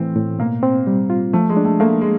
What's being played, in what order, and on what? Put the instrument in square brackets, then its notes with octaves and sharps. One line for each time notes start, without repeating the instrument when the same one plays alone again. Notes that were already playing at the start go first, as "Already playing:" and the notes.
Already playing: [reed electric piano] A2 E3 A3 [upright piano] C4
[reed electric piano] A2
[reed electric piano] B2 [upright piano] A#3
[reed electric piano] C4
G3
F4
[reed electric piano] F3 [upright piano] A3
[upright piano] G#3
[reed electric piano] D4
[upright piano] A3
[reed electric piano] A3 [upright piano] A#3
[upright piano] G#3